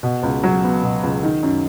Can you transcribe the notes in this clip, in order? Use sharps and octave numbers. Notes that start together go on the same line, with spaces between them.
B2
C#2
F#3
B3
B2
C#2
D#3
F#2